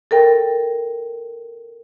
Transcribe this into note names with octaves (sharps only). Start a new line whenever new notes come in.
A4 A#4 G5